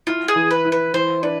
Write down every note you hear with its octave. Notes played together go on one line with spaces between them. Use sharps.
E4 F4
G#4
E3
B4
E4
B4
E3 C5
D4 B4